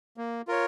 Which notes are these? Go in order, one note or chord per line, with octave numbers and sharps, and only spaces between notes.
A#3
F4 A#4 C#5